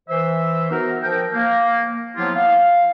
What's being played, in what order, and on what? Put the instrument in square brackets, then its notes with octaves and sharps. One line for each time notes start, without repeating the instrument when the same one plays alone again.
[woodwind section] E3 C5 E5
B3 D#4 F#4 A#4
F3 A#4 G5
A#3
F3 F#3 B3 E4 F4 G4
F5